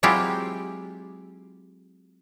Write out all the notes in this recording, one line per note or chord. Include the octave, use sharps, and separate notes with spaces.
F#3 G#3 C4 E4 F4 G4